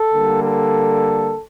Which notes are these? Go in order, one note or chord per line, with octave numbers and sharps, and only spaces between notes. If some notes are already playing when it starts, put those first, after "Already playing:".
Already playing: A4
D3 G3 A#3
A4